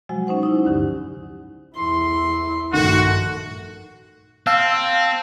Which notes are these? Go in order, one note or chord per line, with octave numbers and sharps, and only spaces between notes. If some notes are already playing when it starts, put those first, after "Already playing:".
C3 F3 F#3 G#3 F#4
C#4 D#4 C5 F#5
D#4 E4
D2 G2 D3 D#4 G4
E2 E4 C6
A#1 G2 D#3 A3 F#4
C4 F5 A5 E6